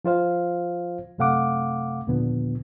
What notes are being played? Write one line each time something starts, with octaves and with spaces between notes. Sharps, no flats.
F3 F4 C5 F5
F#2 C3 A3 F5 F#5 D6
D#2 A#2 D3 F3 B3